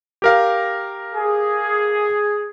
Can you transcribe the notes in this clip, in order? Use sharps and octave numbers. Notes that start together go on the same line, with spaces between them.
G4 A#4 F5
G#4